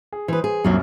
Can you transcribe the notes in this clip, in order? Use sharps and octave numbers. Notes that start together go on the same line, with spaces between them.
G#4
E3 B4 C5 D#6
G#4
C2 F#2 A#2 F#3 A#3 F#4